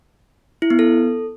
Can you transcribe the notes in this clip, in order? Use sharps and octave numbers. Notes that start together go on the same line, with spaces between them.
E4
B3
A4